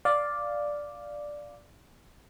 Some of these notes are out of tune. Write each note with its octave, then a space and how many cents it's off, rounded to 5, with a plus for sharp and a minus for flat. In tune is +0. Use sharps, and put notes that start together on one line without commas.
D5 +0 F5 +0